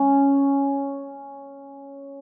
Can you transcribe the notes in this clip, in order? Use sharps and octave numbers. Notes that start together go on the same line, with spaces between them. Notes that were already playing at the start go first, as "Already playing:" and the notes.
Already playing: C#4